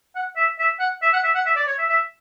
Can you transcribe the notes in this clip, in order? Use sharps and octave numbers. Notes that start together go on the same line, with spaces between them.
F#5
E5
E5
F#5
E5
F#5
E5
F#5
E5
D5
C#5
E5
E5